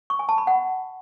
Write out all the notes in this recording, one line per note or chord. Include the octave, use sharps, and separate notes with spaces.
C#6
G#5
A5
B5
F#5